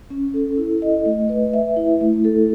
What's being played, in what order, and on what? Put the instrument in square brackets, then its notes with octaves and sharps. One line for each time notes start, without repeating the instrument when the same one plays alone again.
[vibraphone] C#4
A4
E4
D#5
A3
B4
E5
E4
A3
A4